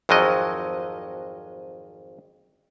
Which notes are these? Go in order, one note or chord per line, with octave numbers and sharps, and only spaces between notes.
G#1 F2 F3 F#3 D#5